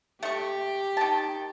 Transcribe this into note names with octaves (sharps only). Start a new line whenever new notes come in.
A3 G4 C#6
D#3 A5